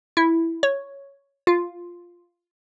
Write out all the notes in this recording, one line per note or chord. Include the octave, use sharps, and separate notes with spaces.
E4
C#5
F4